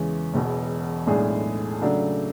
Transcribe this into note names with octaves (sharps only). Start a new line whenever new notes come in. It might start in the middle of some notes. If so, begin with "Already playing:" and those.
Already playing: E2 C#3 E3 G#3 C#4
E1 E2 B2
B1 A2 G#3 D4 G#4
C#3 F#3 A3 D4